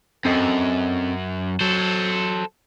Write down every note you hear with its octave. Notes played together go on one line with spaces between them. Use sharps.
F#2 C4 A4 D#5
F#3 A4 C5